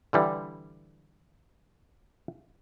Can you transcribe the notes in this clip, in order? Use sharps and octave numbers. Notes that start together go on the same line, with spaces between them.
D3 E3 G3